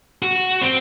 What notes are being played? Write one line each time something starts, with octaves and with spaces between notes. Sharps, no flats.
F#4
C4